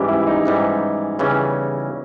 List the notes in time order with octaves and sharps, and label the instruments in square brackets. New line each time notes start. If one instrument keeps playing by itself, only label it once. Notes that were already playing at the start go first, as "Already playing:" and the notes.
Already playing: [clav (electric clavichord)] G#2 E3 G3 [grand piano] C#4 G4
[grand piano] E4
E4
D#4
[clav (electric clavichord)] G#2 E3 G3
E2 C#3 E3 G3 C#4